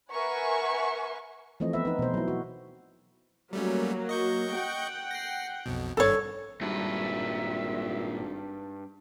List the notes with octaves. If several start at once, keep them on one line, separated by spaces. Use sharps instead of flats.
A#4 B4 E5 F#5 G#5 C#6
E3 F3 A3 C4 D#5
B3 B4 E5
D#4 B4
B2 C5
F#3 E4
F#4
F#3 G3 A3 A#3 C#4
D#5 C#6 G6
F#5 G5
A#6 C7
B1 F2 B2
G#1 G2 D4 A4 C#5
G#1 G2 A#2 B4 E5